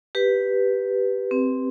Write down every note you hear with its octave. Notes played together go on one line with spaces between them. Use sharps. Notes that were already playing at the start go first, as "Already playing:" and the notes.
G4 B4
C4